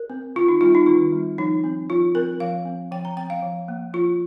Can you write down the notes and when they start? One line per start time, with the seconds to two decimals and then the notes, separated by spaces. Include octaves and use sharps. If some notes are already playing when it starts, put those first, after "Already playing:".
Already playing: A#4
0.10 C4
0.35 D#3 F4
0.48 D#4
0.61 G3 C4 F4
0.75 D#4
0.86 D#3 F4
1.13 G3 C4
1.38 F3 D#4
1.64 C4
1.89 F3 F4
2.15 C4 A#4
2.40 F3 F5
2.65 C4
2.92 F3 G5
3.05 A#5
3.17 C4 G5
3.30 F5
3.43 F3
3.68 A#3
3.94 F3 F4